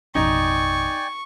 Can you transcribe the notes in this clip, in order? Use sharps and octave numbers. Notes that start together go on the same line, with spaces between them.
A1 F2 B2 D#4 D5 G5 G#5 C#6